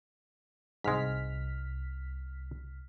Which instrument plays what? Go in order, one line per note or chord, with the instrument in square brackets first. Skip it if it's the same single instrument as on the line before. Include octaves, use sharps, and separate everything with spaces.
[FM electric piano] C2 F6 B6 [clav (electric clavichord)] G#2 G#3